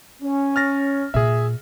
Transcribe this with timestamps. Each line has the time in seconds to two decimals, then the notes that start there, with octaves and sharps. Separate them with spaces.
0.23 C#4
0.56 F6 A6 A#6
1.14 A#2 A#3 G#4 E5